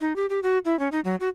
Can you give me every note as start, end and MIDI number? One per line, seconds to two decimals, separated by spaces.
0.01 0.15 63
0.16 0.26 67
0.30 0.40 67
0.43 0.58 66
0.65 0.78 64
0.79 0.89 61
0.92 1.00 63
1.05 1.16 54
1.20 1.29 66